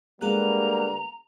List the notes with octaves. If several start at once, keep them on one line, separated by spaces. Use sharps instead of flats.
D3 G3 G#3 A#3 B3 G#4 A#5 F#6